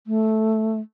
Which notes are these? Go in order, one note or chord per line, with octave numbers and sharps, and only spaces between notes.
A3